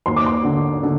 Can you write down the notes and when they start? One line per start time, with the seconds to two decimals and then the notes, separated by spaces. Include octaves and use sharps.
0.06 D#2 C6
0.16 D6
0.26 C6
0.45 D3
0.83 D3